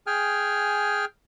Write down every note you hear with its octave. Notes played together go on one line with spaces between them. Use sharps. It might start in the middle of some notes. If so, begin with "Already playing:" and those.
G#4 G5 G#5 F6